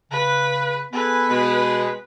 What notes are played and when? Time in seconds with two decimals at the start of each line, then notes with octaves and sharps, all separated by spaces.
0.12 C#3 B4
0.93 B3 G#4 A4 B4 G#5
1.29 B2 G#3